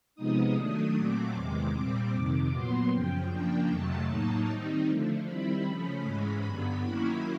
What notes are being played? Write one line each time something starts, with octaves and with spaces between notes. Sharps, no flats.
C3 F3 G#3 B3 D#4 D#6
D#3 F#3 A3 D4
A#2 F#3 A3 C4 D6
E2 C3 D#3 G#3
A#2 G3 C4
F2 C3 D#3
A#2 F#3 B3 C6
F#2 C#3 F3 G5
C#3 F3 A#3 D4
F2 C3 D#3 F#3 A3 A5
A2 F#3 A#3 D#4
D#3 G3 C4 D#4
D3 F3 A3
D#3 G3 C4 E4 B5
C#3 F3 A3 C#4
G#2 E3 G#3 C#4 B5
G2 D3 F#3 B3 B5
D#3 F#3 A#3 C#4 E4 B5